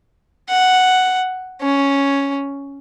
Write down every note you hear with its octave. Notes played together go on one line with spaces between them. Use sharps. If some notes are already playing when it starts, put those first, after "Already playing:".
F#5
C#4